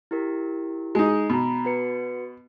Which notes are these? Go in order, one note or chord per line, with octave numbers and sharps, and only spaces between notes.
E4 G4 A#4
G#3 D#4
B2 A#5 B5
F#4 B4 C#7